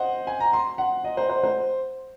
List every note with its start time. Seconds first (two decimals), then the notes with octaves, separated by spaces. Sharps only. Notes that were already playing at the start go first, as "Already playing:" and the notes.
Already playing: C5 D#5 F#5
0.27 G#5
0.40 A#5
0.53 C6
0.78 F#5
1.04 D#5
1.17 C5
1.30 C5
1.43 C5